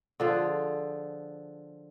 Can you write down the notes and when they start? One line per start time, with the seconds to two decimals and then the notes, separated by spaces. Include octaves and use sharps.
0.20 D3 F3 G#4